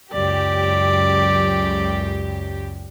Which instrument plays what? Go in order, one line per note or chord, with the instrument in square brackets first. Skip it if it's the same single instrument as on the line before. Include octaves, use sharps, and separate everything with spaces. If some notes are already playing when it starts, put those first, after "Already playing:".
[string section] C#2 F#2 G4 [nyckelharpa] D5